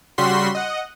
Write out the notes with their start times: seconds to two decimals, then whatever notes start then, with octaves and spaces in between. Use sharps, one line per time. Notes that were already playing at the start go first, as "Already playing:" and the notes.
0.18 C#3 G3 F#4 C6 B6
0.55 D#5 F#5